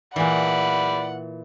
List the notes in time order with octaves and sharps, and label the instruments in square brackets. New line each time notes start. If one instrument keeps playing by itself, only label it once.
[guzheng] A#2 E3 [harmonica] D5 B5 [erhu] F#5